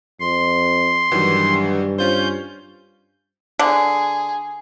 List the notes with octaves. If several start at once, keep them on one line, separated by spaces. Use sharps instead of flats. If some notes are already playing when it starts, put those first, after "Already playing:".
F2 C6
G2 D#3 E3 F#3
C#4 F4 C5 G6
D3 G#4